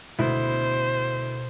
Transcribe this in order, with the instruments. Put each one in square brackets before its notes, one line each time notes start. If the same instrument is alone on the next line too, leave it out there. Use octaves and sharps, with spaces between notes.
[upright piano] D2 E4 [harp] B2 [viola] C5